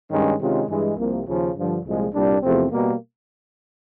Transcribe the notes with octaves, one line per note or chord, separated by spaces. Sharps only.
G2 D#3 G#3 C#4
C3 D#3 G#3 C#4 F4
G2 E3 G#3
C2 C3 F3 A#3
D#2 C#3 F3
G2 D3 F3
C2 A#2 F3 G#3
C2 A#2 G3 A#3 D4
E2 C3 F3 A3 C4
B2 G3 A#3